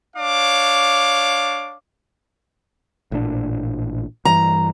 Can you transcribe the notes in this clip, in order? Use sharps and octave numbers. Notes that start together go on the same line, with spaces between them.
D4 C#5 F5 D6
A1 A#2 D4
G2 E3 A#5